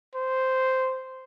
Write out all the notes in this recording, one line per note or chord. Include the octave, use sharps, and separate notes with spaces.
C5